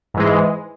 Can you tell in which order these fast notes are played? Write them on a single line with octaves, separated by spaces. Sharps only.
G#2 E3 G#3